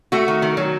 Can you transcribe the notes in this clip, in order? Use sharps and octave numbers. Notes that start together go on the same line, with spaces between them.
A3 F#4
D#3
D#3
F#3